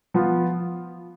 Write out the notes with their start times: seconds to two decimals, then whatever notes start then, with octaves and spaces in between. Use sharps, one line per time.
0.14 F3 B3 F4